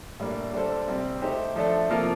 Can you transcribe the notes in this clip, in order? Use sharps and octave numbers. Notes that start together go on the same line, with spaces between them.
A2 G3 A#3 D4
D3 G3 D4 A4 C5
C3 G3 C4
A3 D#4 G4 C5
F3 A3 D4 A4
C3 F3 A#3 F4 A4